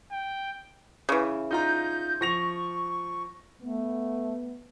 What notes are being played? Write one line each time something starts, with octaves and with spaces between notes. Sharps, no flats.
G5
C#3 E3
D#4 F4 A#5 G6
F3 C#6 A#6 F7
A3 B3